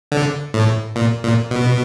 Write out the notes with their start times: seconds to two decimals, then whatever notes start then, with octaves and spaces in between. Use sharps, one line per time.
0.12 D3
0.54 A2
0.96 A#2
1.23 A#2
1.51 B2